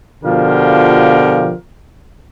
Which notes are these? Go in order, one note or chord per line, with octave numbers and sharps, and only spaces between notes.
B2 D3 F3 F4 G4 A#4